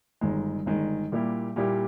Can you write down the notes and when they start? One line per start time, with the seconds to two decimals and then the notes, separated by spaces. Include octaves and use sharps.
0.21 G1 G2 D#3 G#3
0.66 G1 G2 D#3 G#3
1.12 A#2 G3 A#3 E4 G4
1.56 A#2 G3 A#3 E4 G4